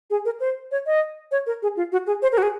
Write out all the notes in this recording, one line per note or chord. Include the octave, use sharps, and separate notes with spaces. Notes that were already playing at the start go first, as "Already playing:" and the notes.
G#4
A#4
C5
C#5
D#5
C#5
A#4
G#4
F4
F#4
G#4
C5
A#4
F#4
G#4